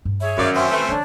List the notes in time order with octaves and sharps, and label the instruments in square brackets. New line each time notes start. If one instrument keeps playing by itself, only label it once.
[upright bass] G2
[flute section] G#4 C#5 E5
[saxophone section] F#2 [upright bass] D#3 E3 [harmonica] D5 F5
[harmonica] C4 C#4 C5 [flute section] E5 F#5
[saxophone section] A3 [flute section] F#4 B4 E5
[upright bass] D3 E3 [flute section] D4 C#5